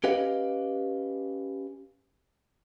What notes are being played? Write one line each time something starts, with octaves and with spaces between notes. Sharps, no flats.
C#4 G4 B4 D#5 F5